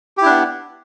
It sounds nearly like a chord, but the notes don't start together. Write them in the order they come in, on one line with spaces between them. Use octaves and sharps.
G4 E4 D4 B3